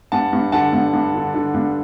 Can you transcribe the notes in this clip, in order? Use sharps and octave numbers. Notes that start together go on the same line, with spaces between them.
G2 F#5 A5
G2
D3 F#5 A5
G2
G2
D3
D3
G2